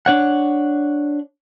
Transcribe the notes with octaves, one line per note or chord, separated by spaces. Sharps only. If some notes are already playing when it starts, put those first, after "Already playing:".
D4 C#5 F#5